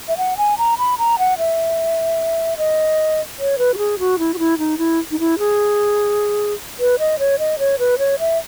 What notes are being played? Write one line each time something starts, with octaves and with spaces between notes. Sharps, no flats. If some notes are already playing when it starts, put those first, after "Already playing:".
E5
F#5
G#5
A#5
B5
A#5
F#5
E5
D#5
C#5
B4
F#4
G#4
F#4
E4
F#4
E4
D#4
E4
D#4
E4
G#4
B4
D#5
C#5
D#5
C#5
B4
C#5
E5